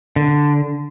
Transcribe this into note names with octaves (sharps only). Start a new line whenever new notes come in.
D3